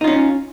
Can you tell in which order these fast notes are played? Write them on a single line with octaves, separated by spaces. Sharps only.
D#4 F4 C#4